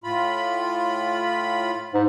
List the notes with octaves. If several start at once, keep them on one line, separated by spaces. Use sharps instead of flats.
A2 F4 B5
G#2